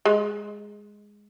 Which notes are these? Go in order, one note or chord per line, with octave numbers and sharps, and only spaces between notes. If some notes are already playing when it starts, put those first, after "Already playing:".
G#3